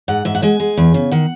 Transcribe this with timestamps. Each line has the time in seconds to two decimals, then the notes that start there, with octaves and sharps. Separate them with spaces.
0.08 G#2 F#5
0.25 G#2 E5
0.35 F#5
0.42 G#3 G#5
0.60 G#3
0.77 E2
0.94 C#3
1.12 D#3 F#5